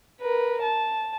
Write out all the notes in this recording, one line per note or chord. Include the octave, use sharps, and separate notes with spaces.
A#4 B4
A5